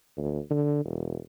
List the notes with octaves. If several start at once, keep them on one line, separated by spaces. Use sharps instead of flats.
D2
D3
E1